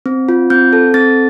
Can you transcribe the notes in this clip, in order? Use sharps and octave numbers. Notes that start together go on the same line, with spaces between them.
C4
F4
C4 G6
A4
C4 A6